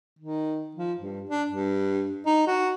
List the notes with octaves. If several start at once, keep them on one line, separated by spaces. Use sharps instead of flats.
D#3
F3
G2
D4
G2
D#4
F#4